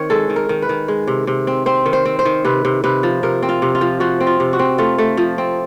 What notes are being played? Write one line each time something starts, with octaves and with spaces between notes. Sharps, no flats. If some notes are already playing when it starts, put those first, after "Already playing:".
Already playing: D#3 C4 C#5
G#3 A4
D#3
A#4
D#3
B4
D#3
G#3
C3
C3
C4
C4 C5
D#3
C5
C4
C5
D#3
C3 B4
C3
C3 B4
F3
C3 A#4
C4
F4
C3
F4
F3
F3 F#4
C4
F4
C3
F#4
C4
A3 F4
A3
F3
C4